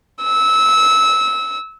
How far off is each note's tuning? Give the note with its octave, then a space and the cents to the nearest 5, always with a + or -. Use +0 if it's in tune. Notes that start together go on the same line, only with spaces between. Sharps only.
E6 -20